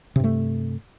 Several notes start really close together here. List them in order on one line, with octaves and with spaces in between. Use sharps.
C3 G2 A3